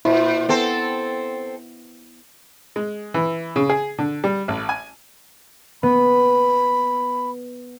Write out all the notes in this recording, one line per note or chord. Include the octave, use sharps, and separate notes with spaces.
A#2 E4 C5
B3 C4 A4 C5
G#3
E3
C#3
G#4
D3
G3
A1
G#5
B3 B5